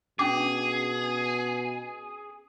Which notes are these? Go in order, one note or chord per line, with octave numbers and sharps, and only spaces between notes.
B2 C#4 D4 G#4 D6